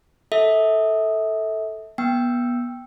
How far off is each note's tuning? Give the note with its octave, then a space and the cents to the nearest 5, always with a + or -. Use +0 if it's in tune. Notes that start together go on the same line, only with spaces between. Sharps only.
A4 +0 E5 -30
B3 -25 G5 +0 E6 +0